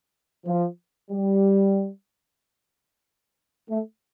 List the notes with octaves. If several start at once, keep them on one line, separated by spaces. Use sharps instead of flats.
F3
G3
A3